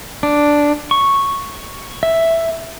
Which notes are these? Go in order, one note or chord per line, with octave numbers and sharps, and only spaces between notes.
D4
C#6
E5